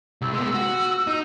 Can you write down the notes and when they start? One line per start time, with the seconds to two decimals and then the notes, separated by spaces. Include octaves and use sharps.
0.21 C2 E6
0.33 G#3 B3 E6
0.54 F#4
1.07 D#4